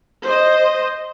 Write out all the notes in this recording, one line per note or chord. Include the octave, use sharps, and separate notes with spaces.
C5 D#5